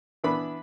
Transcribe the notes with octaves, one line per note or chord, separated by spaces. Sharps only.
E3 B3 D4 B5